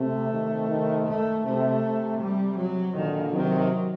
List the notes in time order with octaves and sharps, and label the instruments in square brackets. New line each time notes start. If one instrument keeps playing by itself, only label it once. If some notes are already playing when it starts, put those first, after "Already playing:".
Already playing: [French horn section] C3 [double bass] A3
[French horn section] C3 D#3
C3 D#3
[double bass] A3
[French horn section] C3 [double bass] A3
[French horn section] C3
[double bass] G3
F#3
[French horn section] A#2 D3 [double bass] D#3
[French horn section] C3 D#3 [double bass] F#3